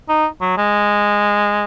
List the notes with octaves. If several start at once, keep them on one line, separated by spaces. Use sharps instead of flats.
D#4
F#3
G#3